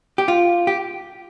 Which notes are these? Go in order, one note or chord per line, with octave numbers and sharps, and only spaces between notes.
G4
F4
G4